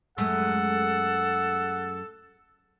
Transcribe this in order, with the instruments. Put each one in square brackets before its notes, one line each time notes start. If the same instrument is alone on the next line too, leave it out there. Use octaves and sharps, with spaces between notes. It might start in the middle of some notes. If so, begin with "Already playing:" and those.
[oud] F#2 G#3 A3 [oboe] A4 [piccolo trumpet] F#5